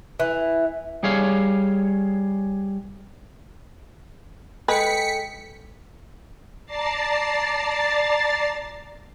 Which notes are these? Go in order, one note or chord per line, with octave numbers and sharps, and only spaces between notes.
E3
G3 G#4 C#5 F5
G#3 G#4 A4 B4 G5 B6 C#7
D5 A5 A#5 A6 C7